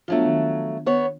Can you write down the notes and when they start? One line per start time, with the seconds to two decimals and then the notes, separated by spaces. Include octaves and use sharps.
0.08 F3 F#3 A3 B3 D4 F4
0.26 D#3
0.86 B3 C#5